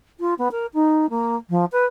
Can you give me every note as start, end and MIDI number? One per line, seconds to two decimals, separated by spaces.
0.20 0.34 65
0.38 0.48 59
0.51 0.66 70
0.74 1.10 63
1.10 1.36 58
1.49 1.65 53
1.72 1.85 71